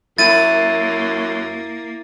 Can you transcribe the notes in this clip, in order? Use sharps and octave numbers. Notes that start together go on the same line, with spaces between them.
F#2 A#3 E4 A6 D#7